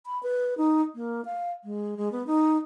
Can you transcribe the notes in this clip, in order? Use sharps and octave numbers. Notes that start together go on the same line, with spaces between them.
B5
B4
D#4
A#3
F5
G#3
G#3
B3
D#4